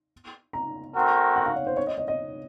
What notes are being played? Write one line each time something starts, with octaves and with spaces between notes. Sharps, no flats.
A#5
A3 C4 F#4 A#4
F#5
F5
C#5
C5
C#5
D#5
D#5
D#5